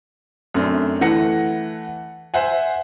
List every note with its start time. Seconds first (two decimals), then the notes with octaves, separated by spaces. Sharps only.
0.54 F#2 A3 C4 D4
1.01 E3 A3 F#5 A#6 C#7
2.34 C5 E5 F#5 G#5